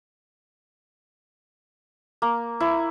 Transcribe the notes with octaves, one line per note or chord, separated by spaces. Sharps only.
A#3
E4